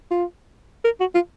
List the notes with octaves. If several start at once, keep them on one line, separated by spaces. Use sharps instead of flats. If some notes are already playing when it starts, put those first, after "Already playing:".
F4
A#4
F#4
F4